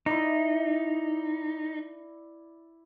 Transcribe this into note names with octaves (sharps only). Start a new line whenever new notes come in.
D#4 E4 D5